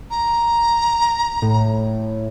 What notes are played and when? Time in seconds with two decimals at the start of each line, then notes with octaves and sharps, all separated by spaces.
0.11 A#5
1.42 A2